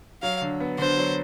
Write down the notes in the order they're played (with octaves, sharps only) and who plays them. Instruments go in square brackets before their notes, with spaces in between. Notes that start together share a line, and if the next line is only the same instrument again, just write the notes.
[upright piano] F#3 [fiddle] F5
[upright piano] D3
B3
[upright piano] D3 [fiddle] C5
[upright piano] F#3